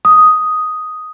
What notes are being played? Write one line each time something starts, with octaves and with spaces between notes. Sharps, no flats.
D#6